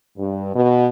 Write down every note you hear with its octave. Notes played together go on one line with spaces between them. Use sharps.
G2
B2